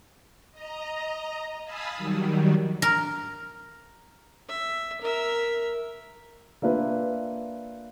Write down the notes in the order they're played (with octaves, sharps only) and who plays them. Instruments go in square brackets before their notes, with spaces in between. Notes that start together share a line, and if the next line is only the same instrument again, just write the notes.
[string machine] D#5 A#5
F5 G#5 A5 B5 D#6 E6
D#3 F#3 G3
[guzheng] A#4
[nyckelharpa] E5
A#4 E5
[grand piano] A#3 D4 F4 B4 E5